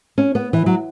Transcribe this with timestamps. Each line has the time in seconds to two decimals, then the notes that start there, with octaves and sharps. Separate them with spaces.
0.18 C#4
0.35 B3
0.53 E3
0.66 F#3